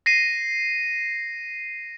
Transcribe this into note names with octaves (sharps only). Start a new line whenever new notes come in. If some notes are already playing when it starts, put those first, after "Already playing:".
A#6 C7 D#7